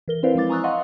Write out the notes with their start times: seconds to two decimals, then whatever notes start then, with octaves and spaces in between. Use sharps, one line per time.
0.08 E3 A#4 G7
0.23 C4 E4 B4 C5 D5 F5
0.35 F3 G#3 E4 D6 A6
0.49 G#5 A#5 C#6 D#6 E6 F#6
0.64 D#5 F5 F#5 C6 C#6